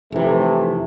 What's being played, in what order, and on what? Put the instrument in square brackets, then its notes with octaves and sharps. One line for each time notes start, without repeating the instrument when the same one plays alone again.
[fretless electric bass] F1 E3 [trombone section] C3 A3